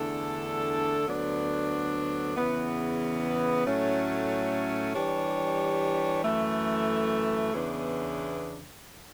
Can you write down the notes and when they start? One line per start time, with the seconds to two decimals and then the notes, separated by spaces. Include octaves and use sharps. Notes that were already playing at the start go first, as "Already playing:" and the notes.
Already playing: E2 D3 A3 D4 A4
1.07 D2 D3 F#3 B3 D4
2.36 E2 C#3 E3 B3
3.65 A2 F#3 A3 C#4
4.95 E3 G3 D4 G4 C#5
6.24 F#2 E3 A3
7.53 E2 C#3 E3 B3 D4